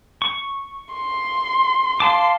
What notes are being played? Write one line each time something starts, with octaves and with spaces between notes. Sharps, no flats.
C#6
C6
F5 A5 C6 D6